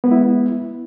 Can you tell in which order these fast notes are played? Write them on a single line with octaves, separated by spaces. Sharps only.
B3 G#3 E4